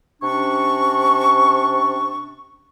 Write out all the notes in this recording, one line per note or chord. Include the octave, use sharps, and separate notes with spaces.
C3 C#4 D4 C#6